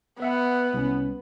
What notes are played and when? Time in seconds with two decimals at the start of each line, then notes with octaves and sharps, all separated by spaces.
0.20 B3 B4 E5 F#5
0.74 C2 C#4